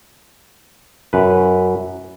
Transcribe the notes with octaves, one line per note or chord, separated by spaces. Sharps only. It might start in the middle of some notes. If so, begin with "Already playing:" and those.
F#2 B4